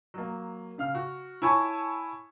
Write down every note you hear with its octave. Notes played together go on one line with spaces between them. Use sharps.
F#3 A#3
C#3 F5 F6
F#4
E4 C#5 G#5 A5 C#6